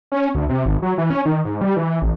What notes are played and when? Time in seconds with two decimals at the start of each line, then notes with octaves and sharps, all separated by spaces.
0.12 C#4
0.35 D2
0.49 C3
0.65 G#1
0.82 F#3
0.98 E3
1.10 C#4
1.25 D#3
1.45 G#2
1.61 G3
1.76 E3
2.02 A1